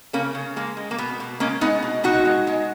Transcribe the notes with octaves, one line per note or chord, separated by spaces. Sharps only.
C#3 A#3 C#4
C#3
G#3 A#3
G#3
A#3
B2 B3
B2
G#3 A#3 C#4
G#3 B3 D#4
B2
B2 D#4 F#4
G#3
G#3